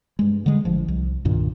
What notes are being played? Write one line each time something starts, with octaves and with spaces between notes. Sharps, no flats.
G2 G#3
D3 G3 G#3
A1 F3
C2
C2 G2 A#2 D#3